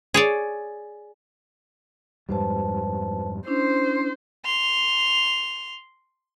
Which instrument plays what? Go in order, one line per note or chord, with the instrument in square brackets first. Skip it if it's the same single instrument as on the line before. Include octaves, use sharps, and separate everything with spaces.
[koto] G#4 C#5 D5
[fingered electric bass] F2 G#2 G3 [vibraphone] B4 C5 A5
[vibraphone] C#4 D4 E4 [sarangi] C5
[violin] C6 F7